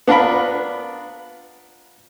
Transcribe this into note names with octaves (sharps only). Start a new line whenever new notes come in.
B3 D4 F4 A#4 B5